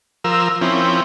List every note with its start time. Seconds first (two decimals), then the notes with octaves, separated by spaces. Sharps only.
0.24 F3 A#4 E6
0.61 F3 C4 C#4 E4